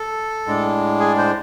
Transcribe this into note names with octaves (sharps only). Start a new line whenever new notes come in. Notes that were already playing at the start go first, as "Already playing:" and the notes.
Already playing: A4
A2 G#3 D4
G#4
C5